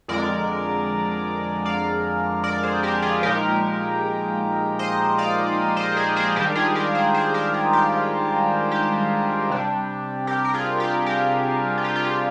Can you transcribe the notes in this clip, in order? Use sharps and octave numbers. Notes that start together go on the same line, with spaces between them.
F2 D3 G#3 A#4 D5
D5 F5
A#4 D5
G#4 C5
G4 A#4
F4 G#4
A#2 F3 G#3 D#4 G4 A#4
C5 D#5
D5 F5
C5 D#5
G#4 C5
G#4 C5
G#2 D#3 G3 D4 G4 A#4
F4 G#4
G4 A#4
G#4 C5
G#4 C5
G4 A#4
F4 G#4
G4
F4
G4
C3 G3 D4
G4 A#4
A#4
F4 G#4
G4
G4 A#4
F4
G4
F4
G4